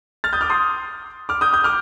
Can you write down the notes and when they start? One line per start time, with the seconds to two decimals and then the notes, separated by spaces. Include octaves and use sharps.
0.24 F6 A6
0.33 D#6 G6
0.41 D6 F6
0.50 C6 D#6
1.29 D6 F6
1.41 D#6 G6
1.53 D#6 G6
1.64 D6 F6